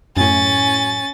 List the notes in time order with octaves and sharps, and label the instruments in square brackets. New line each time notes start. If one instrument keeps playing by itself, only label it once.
[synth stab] F#2 A2 [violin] C#4 A6 [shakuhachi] G#5